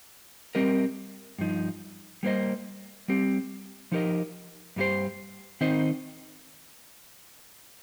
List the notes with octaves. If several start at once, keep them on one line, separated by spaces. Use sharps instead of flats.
G3 C4 G4 A#4 D#5
G2 F3 D#4
G3 A#3 F4 C5 D#5
G3 C4 G4
F3 D#4 G4 A#4 D#5
G2 G3 D#4 G4 C5
D#3 C4 D#4 C5 D#5